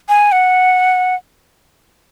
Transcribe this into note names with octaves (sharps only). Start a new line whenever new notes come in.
G#5
F#5